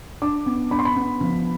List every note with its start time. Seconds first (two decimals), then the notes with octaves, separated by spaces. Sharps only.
0.22 D4 D6
0.46 B3
0.71 D4 B5
0.79 C6
0.85 B5
0.96 B3
1.21 F3